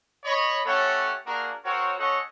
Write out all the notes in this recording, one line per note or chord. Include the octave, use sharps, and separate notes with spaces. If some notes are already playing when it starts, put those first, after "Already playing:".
C#5 D#5 B5
A3 C#4 G4 A4 C#5 F#5
A#3 D4 F#4 G#4 A#4
C4 F#4 A#4 C5 C#5
C#4 A4 C#5 D#5 F#5 C#6